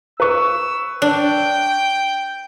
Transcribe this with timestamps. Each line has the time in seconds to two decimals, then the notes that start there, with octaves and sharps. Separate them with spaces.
0.20 B4 C#6 E6
1.02 D4 G5